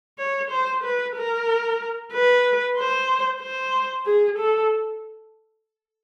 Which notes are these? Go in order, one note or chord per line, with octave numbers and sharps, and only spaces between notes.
C#5
C5
B4
A#4
B4
C5
C5
G#4
A4